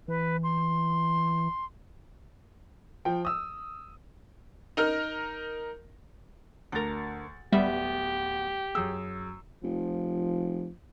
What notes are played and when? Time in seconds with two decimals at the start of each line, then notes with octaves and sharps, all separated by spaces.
0.08 E3 B4
0.43 C6
3.05 F3 G5
3.25 D#6 E6
4.77 D#4 A#4 F6
6.72 D2 D4 A#4 A6
7.53 D1 G3 B3 G4 E5
8.75 F#2 G#4 E6
9.63 F1 F3